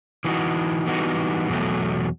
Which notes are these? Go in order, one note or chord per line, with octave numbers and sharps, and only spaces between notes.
E3 G3 B3 D#4 F#4
E3 G3 B3 D#4 F#4
E2 B2 F#3 A3